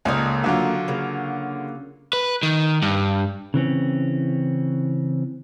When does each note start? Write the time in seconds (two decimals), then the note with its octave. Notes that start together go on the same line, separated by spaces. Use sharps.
0.05 C#2 A3 A#3 D#4
0.44 D3 F#3 F4
0.88 C#3 A#3
2.13 B4
2.43 D#3
2.82 G2
3.54 C#3 E3 C4 C#4